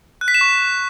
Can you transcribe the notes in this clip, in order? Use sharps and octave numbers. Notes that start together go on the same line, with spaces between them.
F#6
B6
E7
C#6